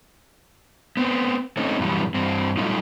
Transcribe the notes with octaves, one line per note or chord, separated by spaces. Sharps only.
B3 C4
A3 C4 C#4 D#4
F#2 C3 E3 G3
G2 C4
F#3 G3 A3 A#3 D#4 F4